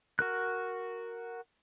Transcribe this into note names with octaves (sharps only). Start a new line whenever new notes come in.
F#4 A#4 F#6